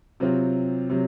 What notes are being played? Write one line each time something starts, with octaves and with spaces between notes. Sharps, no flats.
C3 F#3 C4 F4
C3 F#3